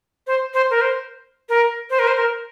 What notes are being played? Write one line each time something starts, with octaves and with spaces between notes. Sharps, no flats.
C5
C5
A#4
C5
A#4
C5
A#4
C5
A#4